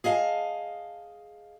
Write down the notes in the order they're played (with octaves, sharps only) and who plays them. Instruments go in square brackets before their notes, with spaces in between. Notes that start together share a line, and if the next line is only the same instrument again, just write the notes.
[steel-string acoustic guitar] G#4 D#5 F5 G#5 A5